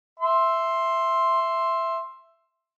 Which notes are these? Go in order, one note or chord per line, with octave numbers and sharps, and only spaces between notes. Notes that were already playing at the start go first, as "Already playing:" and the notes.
E5 C6